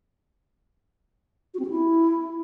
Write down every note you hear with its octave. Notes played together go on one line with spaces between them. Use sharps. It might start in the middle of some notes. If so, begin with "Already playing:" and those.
F#4
C4
G4
E4